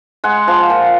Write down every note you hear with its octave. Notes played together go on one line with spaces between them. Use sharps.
G#3 F#5
F3
A#2